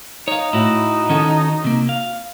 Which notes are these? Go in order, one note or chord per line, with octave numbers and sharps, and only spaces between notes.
D#4 C#5 F5
A2 E4 F#4
D#3 C#4 F#4 A4
C3 A#3
F5